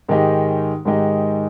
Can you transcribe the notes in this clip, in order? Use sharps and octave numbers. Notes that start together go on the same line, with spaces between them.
G#2 D#3 G#3 D#4 G4
G#2 D#3 G#3 D#4 G4